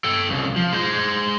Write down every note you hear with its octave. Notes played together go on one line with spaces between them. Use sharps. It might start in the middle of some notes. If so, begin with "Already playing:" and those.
A4 G5
C2 C#3
F3
G#3 C5